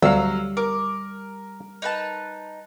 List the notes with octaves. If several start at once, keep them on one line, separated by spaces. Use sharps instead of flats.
D2 F#3 G3 F5 E6
A#4 D6
D#4 B4 A5